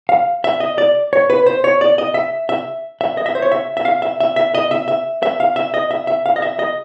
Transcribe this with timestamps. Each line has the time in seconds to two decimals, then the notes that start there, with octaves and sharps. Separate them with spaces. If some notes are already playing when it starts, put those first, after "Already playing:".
0.09 F5
0.44 E5
0.60 D#5
0.78 D5
1.13 C#5
1.30 B4
1.46 C5
1.64 C#5
1.81 D5
1.98 D#5
2.14 E5
2.49 E5
3.01 E5
3.17 D#5
3.26 E5
3.35 C5
3.42 C#5
3.52 E5
3.77 E5
3.85 F5
4.02 E5
4.20 E5
4.36 E5
4.55 D#5
4.71 E5
4.88 E5
5.23 E5
5.40 F5
5.56 E5
5.74 D#5
5.91 E5
6.07 E5
6.26 F5
6.36 D#5
6.42 E5
6.59 D#5